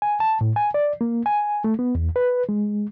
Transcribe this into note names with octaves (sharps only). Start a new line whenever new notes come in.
G#5
A5
A2
G#5
D5
A#3
G#5
A3
B3
E2
B4
G#3